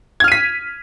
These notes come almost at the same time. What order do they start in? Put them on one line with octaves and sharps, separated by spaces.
G#6 F6 D#7 B6